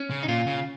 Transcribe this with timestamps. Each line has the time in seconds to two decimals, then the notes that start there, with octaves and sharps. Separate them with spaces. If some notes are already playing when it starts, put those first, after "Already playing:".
Already playing: C#4
0.10 C#3
0.23 D#4
0.28 A#2 F4
0.47 C#3